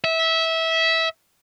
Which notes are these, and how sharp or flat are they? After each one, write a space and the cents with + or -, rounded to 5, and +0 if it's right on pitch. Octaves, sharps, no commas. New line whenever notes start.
E5 -20